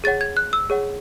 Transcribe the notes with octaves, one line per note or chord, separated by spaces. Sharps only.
G#4 C#5 F#5 A6
G#6
F#6
E6
G#4 C#5 F#5